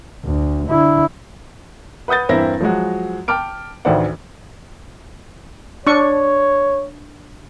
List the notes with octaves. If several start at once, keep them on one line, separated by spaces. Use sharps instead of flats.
D2
D3 E4
B4 F#5 D#6 G6 A6
E2 G2 C4 E4 A#4 A#6
F3 F#3 G#3 F#4
G5 A5 D6 F6 D7
A1 D2 D#3 C5 D5 F#5
D4 C#5 C#6